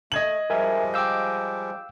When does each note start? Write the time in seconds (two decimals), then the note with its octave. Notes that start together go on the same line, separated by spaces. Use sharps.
0.12 A3 D#5 G#6 F#7
0.50 F3 G3 G#3 A#4 E5 G#5
0.94 F5 G5 D6 E6 G6